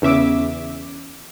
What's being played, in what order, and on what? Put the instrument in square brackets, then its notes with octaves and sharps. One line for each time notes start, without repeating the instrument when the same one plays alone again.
[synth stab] E2 C#3 E5 D6